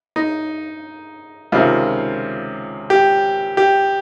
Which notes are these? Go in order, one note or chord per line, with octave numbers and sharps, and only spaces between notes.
D#4
C#2 C3 D#3 F4
G4
G4